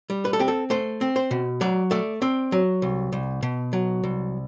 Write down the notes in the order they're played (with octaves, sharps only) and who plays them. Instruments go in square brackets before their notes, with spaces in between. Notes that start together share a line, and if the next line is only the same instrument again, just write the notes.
[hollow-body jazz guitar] G3
B4
A4
C4 G4
A4
A3 C5
C4
C5
B2
F#3 D5
A3 D5
C4 D5
F#3
C2
C2
B2
F#3
C2